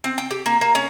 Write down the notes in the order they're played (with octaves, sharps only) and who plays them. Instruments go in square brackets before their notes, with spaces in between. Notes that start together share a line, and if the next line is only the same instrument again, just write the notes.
[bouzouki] C4
G5
G4
A#3
A#3
C#4